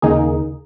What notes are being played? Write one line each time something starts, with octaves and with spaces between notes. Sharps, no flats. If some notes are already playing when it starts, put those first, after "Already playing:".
D#2 C#3 A#3 D#4 G#4